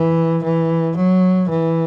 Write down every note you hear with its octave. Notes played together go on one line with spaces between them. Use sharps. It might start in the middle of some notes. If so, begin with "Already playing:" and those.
Already playing: E3
E3
F#3
E3